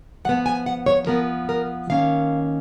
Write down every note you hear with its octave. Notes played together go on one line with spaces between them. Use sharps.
F3 B3 F#5
G#5
F#5
C#5
F3 B3 A#4
A#4
D#3 A#3 C#4 F5